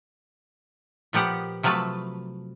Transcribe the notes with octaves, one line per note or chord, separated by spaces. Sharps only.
A#2 F3 B3 G4 F#5
C3 F3 F#3 A3 B4 A5